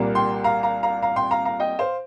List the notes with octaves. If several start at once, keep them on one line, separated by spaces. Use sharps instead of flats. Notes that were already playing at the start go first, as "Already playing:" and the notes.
Already playing: C2 A#2 G3 A#3
G5 C6
F5 A#5
F5 A#5
F5 A#5
F5 A#5
G5 C6
F5 A#5
F5 A#5
D#5 G5
C5 F5